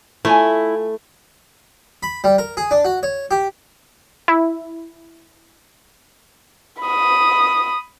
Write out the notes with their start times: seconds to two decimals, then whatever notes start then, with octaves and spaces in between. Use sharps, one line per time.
0.25 A3 E4 F4 C#5 G#5
2.03 B5
2.24 G3
2.38 A#4
2.57 G#4
2.71 D4
2.85 F#4
3.03 C#5
3.31 G4
4.28 E4
6.82 B5 D#6